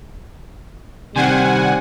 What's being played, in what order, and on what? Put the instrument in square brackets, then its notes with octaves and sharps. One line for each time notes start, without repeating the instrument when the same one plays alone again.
[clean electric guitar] C3 D#3 C4 [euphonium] G3 [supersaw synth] F#5 G#5